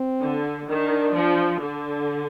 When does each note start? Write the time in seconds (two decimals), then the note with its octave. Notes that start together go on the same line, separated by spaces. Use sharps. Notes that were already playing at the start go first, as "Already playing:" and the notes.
Already playing: C4
0.22 D3
0.69 D#3 D4
1.15 F3
1.61 D3